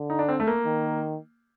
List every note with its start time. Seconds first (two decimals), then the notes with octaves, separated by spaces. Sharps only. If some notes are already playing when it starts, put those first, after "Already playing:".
Already playing: D3
0.10 D#4
0.19 D4
0.28 C4
0.40 A3
0.47 A#3
0.66 D#3